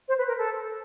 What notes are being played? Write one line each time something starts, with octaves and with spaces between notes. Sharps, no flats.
C5
B4
A#4
A4